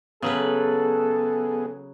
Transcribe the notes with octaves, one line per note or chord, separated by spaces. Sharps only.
C#3 F#3 B3 G#4 A4 B4